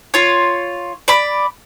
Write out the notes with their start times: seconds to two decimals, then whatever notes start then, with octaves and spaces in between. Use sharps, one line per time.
0.14 F4 C#5
1.08 D5 B5